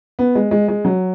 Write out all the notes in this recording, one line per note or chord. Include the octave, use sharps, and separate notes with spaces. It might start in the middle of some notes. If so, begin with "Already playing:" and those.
B3
G#3
G#3
G#3
F#3